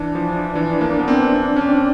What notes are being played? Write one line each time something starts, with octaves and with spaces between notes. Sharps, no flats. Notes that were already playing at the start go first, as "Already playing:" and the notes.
Already playing: E3 D4
F3
E3
A#3
A#3
B3
C4
C4
C#4
C4